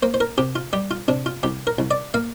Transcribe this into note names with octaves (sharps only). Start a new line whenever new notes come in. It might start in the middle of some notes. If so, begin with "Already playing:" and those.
A#3 C5
C5
A#4
C3 G4
F4
G3 G4
F4
C3 D4
F4
C2 G4
A#4
C2
D5
A#3 F5